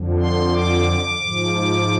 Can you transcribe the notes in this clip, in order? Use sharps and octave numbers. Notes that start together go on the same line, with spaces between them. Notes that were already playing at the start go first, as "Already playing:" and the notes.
Already playing: F2 D3 F3
C6
D6
G#2 F3